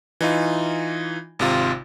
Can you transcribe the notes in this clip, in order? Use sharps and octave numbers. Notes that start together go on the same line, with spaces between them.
E3 D#4 F4
G#1 C3 F4